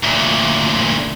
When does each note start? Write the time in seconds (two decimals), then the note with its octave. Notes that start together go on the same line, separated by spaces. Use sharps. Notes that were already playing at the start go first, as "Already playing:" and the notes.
0.04 D2 A#2